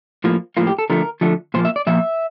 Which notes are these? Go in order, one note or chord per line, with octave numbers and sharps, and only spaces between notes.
A2 F3 A#3
A2 F3 A#3 F4
G4
A4
D3 F3 A3 A#4
D3 F3 A3
A#2 F3 A#3 C5
E5
D5
A#2 F3 A#3 E5